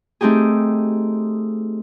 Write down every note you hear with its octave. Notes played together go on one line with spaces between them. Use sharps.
A3 C4 D#4 G4 G#4